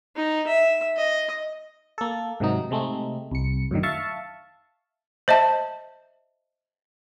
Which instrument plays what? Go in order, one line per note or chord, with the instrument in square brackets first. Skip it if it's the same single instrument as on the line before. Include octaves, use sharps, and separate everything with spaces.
[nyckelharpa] D#4
E5
D#5
[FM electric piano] A#3 A4
G#2 C3 D#3 F#3 D#4
C3 G#3 A3 C4 D#4
C2 C#7
F#2 A2 D3 D#3
E5 F5 A5 C#6
[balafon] C5 D#5 E5 A5